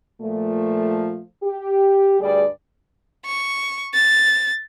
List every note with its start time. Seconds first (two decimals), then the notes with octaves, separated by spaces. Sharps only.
0.21 A#2 F3 A3
1.43 G4
2.20 D2 G2 G3 G#4 D5
3.26 C#6
3.94 A6